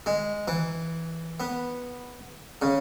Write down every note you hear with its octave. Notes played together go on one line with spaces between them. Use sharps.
G#3
E3
B3
C#3